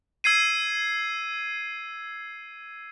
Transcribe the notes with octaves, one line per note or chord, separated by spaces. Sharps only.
E6 G#6 C7 D#7